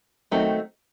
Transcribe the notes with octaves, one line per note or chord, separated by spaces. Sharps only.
D#3 F#3 A3 C4 D#4